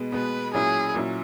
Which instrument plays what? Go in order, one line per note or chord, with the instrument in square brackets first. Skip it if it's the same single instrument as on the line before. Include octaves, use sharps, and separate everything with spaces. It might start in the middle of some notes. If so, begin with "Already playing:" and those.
Already playing: [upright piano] B2 G#3 B3
[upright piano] B2 G#3 B3 [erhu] B4
[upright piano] A#2 F#3 C#4 E4 [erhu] G#4
[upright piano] A#2 F#3 C#4 E4